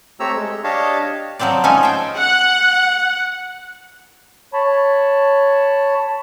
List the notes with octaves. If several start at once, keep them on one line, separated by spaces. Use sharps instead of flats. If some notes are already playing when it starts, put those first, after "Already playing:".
A3 C4 G4 C#5 A#5 E6
G#3
D4 G4 C#5 D#5 F5 A5
F3 F#3 C4 C5 D5
F3 G#3 C#4 D#4 A4 G#5
C5 G5
F#5
C#5 A5 B5